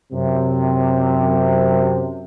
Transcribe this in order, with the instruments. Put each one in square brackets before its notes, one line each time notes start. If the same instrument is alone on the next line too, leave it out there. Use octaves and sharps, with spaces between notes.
[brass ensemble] F#2 C3